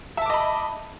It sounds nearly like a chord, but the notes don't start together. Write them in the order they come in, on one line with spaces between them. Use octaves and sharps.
E5 A5 D6 D#5 B5